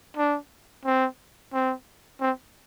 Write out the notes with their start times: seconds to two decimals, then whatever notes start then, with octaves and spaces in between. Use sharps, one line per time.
0.17 D4
0.85 C4
1.53 C4
2.21 C4